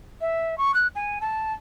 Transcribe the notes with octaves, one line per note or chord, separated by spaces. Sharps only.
E5
C#6
F#6
G#5
A5